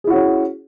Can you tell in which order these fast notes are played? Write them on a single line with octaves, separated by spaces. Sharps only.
G#4 E4 F#4 C#4